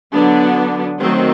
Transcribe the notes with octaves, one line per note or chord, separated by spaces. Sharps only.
D3 F#3 B3 D4
D#3 F#3 A3 C4